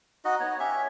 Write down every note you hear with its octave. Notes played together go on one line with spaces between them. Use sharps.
D#4 F#4 D#5
B3 C#5
C#4 G4 C#5 E5